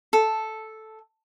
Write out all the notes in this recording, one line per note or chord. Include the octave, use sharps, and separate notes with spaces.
A4